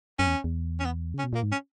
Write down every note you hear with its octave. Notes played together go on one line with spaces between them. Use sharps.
F#2 C#4
E2
E2
C#4
B3
C#3 C#4
B2
A#2 A#3
G#2
C#4